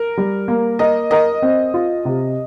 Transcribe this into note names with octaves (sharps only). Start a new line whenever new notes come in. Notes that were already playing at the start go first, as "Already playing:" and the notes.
Already playing: A#4
G3
A#3
A#4 D#5
A#4 D#5
C4
F4
C3